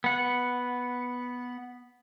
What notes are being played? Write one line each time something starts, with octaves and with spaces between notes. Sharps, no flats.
B3 F#5